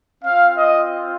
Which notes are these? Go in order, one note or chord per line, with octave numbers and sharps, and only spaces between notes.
C4 F4 F5
D#5